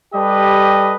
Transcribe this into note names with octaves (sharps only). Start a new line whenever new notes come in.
G3 G4 A4 B4 D#5